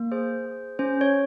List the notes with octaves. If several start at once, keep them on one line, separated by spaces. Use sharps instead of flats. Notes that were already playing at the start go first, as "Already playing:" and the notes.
Already playing: A#3
G#4 C5
G#4
C#4 C5
C#5